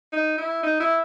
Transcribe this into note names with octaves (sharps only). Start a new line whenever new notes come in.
D#4
E4
D#4
E4